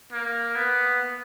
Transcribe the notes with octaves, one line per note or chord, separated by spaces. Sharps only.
A#3
B3